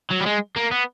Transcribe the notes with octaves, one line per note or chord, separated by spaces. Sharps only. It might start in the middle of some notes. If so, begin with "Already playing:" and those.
F#3
G3
G#3
A#3
B3